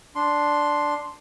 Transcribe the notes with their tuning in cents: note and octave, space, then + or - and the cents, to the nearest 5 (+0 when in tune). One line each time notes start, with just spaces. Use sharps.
D4 +0 C6 +0